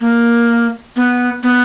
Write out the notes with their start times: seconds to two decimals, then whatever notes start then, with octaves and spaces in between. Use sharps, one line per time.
0.01 A#3
0.96 B3
1.43 B3